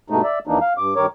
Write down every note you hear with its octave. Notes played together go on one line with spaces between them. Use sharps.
G2 B2 G#3 A3 D#4
D5 E5
D#2 E3 A#3 D4 D#4
F5
G2 D6
G2 D#3 A#4 C#5 D6